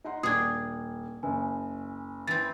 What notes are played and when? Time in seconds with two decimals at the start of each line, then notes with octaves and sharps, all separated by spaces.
0.04 D#4 F#5 C6
0.23 D#1 D4 G#4 D#6 G#6
1.23 F#1 G#5
2.27 E3 C4 A6